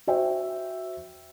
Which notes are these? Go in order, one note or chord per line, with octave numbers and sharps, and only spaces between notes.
F#4 C5 E5 G5